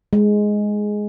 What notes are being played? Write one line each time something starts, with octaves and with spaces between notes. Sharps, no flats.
G#3